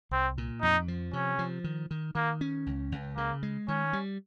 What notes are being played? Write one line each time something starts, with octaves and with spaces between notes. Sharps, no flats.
C2 C4
A#2
F2 D#4
F3
C3 C#4
F3
D#3
D#3
D#3 A#3
C#4
C#2
C#2
C#3 A#3
G#3
D#3 C#4
G3